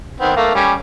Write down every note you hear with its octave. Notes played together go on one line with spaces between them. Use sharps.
D#3 B3 C4
A3 A#3 F5
G3 C#4